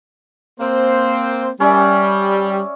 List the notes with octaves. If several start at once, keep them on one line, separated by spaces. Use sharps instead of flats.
A#3 C4 C5
G3 C#4 D5 E5